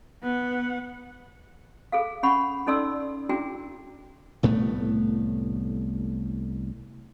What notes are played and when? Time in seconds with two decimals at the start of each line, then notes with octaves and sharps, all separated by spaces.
0.23 B3 F#5
1.92 G#4 A4 F5
2.23 C#4 F#5 B5 C#6
2.67 C#4 D#4 A4 D5 C6 E6
3.29 D4 E4 F#4 G#4 G5
4.43 C2 A2 A3 B3